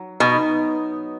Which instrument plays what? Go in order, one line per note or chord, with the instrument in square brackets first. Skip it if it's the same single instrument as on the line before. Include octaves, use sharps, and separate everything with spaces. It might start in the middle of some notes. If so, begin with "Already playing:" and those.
Already playing: [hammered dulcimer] F#3
[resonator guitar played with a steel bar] B2 [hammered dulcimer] B3 D#4